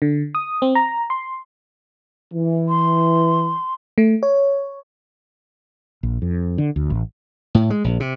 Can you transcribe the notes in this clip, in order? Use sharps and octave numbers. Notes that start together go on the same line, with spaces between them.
D3
D#6
C4
A#5
C6
E3
C6
A3
C#5
A#1
F2
D3
D2
A1
A2
G#3
A#1
C3